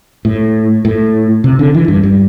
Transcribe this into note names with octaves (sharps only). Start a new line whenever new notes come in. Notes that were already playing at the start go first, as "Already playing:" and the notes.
A2
A2
C3
D3
E3
G2
G2